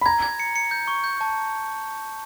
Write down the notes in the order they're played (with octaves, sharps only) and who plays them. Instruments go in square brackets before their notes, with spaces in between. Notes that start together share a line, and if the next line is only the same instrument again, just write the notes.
[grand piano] B5
[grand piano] A#5 [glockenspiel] G#6
[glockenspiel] G#6
C#7
C#7
G6
C#6
G6
A5